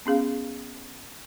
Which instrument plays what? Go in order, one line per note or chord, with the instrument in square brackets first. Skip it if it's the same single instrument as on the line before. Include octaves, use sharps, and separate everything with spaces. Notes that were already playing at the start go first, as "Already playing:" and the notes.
[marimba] B3 C#4 G#4 F5